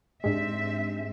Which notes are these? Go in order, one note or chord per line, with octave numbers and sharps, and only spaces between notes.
G#2 G#3 C4 D4 G4 E5